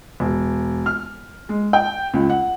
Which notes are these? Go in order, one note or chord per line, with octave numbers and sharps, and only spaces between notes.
E1
F6
G#3
G5
C#2
F#5